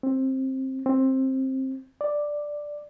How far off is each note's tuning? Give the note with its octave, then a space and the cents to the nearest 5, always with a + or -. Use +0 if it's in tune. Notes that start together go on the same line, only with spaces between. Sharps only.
C4 +15
C4 +15
D5 +5